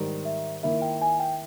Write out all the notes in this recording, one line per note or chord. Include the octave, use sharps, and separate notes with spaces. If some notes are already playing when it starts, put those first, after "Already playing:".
Already playing: G#2 D#3 G3
E5
D#3 A#3 E4 E5
G5
G#5
G5